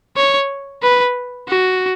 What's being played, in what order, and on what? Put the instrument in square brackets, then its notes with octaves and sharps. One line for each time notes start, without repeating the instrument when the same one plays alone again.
[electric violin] C#5
B4
F#4